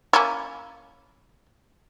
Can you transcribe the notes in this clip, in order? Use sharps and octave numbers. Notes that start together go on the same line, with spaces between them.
A#3 C#4 E4